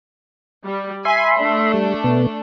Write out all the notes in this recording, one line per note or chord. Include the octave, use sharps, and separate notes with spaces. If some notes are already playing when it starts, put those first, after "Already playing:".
G3
E5 G#5 B5 C6
A3 D4
G3
B2 B3